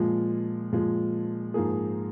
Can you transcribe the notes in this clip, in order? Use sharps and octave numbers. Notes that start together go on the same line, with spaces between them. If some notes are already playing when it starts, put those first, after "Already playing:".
Already playing: A#2 F3 G#3
A#2 F3 G#3
G#2 F3 A#3 G#4